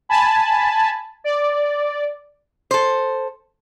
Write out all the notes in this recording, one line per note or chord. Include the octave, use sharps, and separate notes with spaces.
G#5 A5 B5
D5
A4 C5